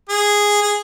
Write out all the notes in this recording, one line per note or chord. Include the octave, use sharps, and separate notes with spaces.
G#4
G#4